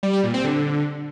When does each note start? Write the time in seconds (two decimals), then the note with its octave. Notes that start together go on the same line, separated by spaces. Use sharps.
0.03 G3
0.13 G3
0.24 A#2
0.34 C4
0.44 D3